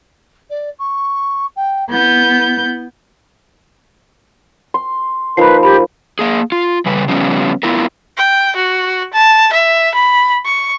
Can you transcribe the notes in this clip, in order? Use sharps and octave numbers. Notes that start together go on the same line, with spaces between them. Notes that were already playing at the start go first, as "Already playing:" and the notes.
D5
C#6
G5
B3 E4 G6
C6
F3 A#3 D#4 B4 B5 C7
G4 B5
A#3 G#4
F4
C#3 G3 B4
C#3 F3 G3 B3 C#4
B3 E4 F4 A#4
G5
F#4
A5
E5
B5
C#6